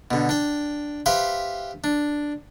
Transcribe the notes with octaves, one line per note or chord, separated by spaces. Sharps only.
B2 D3
D4 G5
G4 B4 C5 E5 F5 G5
D4